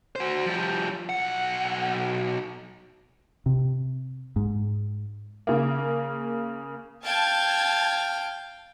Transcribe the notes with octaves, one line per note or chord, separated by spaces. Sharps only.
F#4 C5
F3 G3
B1 F#5
C3
G#2
C#3 A#3
F5 G5 A5 G#6